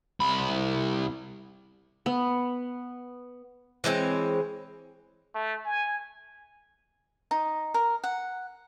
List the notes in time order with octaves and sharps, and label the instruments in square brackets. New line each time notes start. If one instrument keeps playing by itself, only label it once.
[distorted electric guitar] C2 B5
[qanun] B3
[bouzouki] E3 G#3 C4 C#5
[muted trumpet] A3
G#5
[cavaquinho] D#4
A#4
F#5